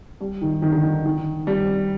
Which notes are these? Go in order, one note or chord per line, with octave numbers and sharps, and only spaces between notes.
G3
D#3
D#3
D3
D#3
D#3
G3